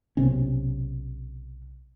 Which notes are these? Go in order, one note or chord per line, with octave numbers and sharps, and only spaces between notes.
B1 C3 C#4